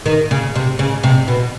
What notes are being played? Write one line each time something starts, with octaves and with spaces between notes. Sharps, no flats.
D#3
C#3
C3
C#3
C3
B2